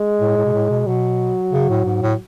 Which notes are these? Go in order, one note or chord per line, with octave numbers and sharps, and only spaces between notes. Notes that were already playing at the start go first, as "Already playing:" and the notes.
Already playing: G#3
A2
A2
B2
A2
B2
B2 F#3
C#3
A2
G#2
A2